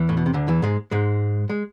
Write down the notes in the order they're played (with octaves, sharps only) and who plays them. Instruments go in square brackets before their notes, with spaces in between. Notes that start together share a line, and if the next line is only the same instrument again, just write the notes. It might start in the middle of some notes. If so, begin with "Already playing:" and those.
Already playing: [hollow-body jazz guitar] E2 E3
A2
B2
C3
D2 D3
E2 E3
G#2 G#3
G#2 G#3
G#3